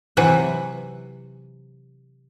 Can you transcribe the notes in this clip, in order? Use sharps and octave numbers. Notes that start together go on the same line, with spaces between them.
C3 E3 F#3 F#4 E5 F#5